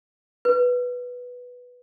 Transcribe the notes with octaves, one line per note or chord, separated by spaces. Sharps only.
B4